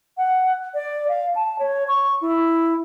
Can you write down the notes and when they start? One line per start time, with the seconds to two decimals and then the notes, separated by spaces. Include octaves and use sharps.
0.17 F#5
0.74 D5
1.08 F5
1.35 A5
1.59 C#5
1.88 C#6
2.21 E4